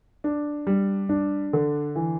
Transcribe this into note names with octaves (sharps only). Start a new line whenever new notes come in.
D4
G3
D4
D3
E3